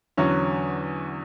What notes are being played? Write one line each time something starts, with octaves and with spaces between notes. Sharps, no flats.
E2 D3 F#3 C#4 F#4